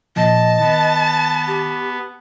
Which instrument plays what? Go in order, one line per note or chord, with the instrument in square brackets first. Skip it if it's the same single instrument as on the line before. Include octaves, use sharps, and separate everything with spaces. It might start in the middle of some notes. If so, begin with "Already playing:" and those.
[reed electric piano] A#2 F3 [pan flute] D#5 [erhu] A5
[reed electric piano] D#3 [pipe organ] B3
[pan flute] G4